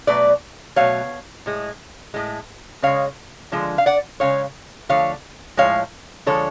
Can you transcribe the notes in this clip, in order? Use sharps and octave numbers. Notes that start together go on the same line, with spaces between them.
B2 F#3 A3 B4 D5
B2 F#3 A3 C#5 F5
A2 G#3
A2 G#3
C#3 G#3 C#5 F5
D3 F3 G#3
F5
D5 F#5
C#3 G#3 C#5 F5
D3 F3 A3 C#5 F5
A2 F3 G#3 C#5 F5
D3 F3 G#3 A4 C#5